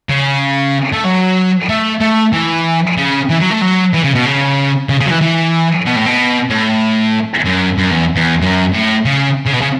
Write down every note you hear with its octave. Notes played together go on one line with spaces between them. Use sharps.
C#3
A3
F#3
A3
A3
E3
C#3
E3
F#3
A3
F#3
E3
C#3
B2
C#3
C#3
C#3
F#3
E3
E3
B2
A2
B2
A2
F#2
F#2
E2
E2
F#2
A2
C#3
C#3
B2
C#3